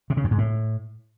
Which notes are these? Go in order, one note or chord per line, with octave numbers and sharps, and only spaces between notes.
C3
C#3
F2
G#2
A2